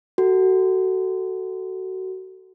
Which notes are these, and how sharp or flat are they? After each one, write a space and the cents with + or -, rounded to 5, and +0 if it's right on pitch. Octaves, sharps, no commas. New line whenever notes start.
F#4 +25 A4 +15